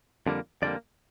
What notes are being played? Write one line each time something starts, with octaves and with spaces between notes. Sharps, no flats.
F2 D3 G3 A#3
F2 D3 G3 A#3 D5